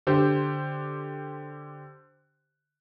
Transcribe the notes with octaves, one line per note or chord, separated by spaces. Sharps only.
D3 G4 C5